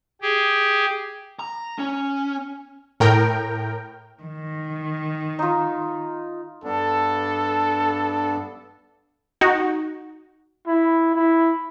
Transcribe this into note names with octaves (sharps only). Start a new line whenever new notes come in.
G4 G#4
A#5
C#4
A2 A#4 G5
D#3
D#4 F4
G2 B3 D4 A4
D#4 F#4
E4
E4